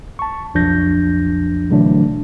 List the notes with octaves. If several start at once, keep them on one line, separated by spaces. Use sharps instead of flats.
A5 C#6
B1 F2 F3 D4 G6 A#6
B2 D3 E3 F#3 A3 D4